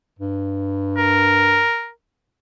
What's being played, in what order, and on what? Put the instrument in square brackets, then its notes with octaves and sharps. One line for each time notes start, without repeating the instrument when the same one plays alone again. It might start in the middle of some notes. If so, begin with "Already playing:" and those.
[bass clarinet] G2
[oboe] A#4